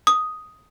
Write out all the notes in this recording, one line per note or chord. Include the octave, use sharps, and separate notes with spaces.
D#6